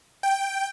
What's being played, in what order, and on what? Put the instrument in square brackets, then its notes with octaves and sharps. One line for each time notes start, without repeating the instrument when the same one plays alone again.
[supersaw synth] G5